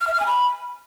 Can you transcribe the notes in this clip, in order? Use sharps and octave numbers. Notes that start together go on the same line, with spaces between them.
F6
E5
F6
G#5
B5